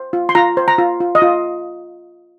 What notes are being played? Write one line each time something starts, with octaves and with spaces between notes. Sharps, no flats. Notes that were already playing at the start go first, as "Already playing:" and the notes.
Already playing: C5
F4
C6
F4 A#5
C5
A#5
F4
F4
D#5
F4